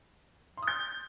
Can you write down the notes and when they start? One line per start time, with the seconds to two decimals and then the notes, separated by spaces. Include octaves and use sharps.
0.57 C6
0.63 D#6
0.68 G6